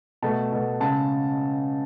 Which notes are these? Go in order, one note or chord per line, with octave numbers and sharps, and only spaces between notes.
B2 A3 A5
B2 A3
C#3 G#3 A5